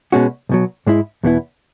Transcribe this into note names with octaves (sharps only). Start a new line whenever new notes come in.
B2 G#3 C#4 F#4
B1 B2 F#3
G#2 G#3 E4
E2 B2 B3 E4